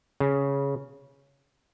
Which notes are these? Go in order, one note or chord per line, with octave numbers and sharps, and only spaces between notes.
C#3